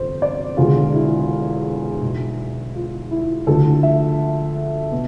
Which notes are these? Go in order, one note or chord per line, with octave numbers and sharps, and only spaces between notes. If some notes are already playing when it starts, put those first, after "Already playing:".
Already playing: G1 F2 C3 E3 C5
D5
E1 E2 D3 F4
E4
B1 B2
F4
E4
D2 D3 F3 A4
E5
B2